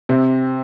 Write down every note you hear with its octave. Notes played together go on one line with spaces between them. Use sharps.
C3 C4